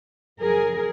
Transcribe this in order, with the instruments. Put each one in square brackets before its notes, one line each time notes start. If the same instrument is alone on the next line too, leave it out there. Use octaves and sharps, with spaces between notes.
[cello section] F#2 C#3 F3 G#4 A#4